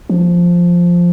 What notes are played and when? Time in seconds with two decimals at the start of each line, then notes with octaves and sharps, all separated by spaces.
0.10 F3